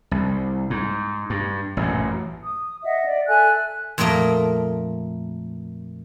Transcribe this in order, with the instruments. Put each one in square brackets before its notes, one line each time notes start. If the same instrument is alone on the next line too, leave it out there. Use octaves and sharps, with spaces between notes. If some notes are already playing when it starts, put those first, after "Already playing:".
[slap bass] C2
G#2
G2
A1 F#2 A#2
[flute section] D#6
D#5 E5 F#5
D5
A4 E5 G#5 F#6
[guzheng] F2 A#2 A3 A#3 D#5